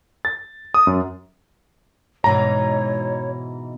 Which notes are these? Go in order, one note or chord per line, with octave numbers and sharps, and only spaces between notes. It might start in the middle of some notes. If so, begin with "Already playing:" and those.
A6
D#6
F#2
G#2 B2 E3 C#5 A#5